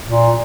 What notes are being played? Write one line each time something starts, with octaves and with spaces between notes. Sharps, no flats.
A#2